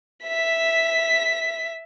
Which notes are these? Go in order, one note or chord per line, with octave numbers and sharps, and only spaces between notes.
E5 B6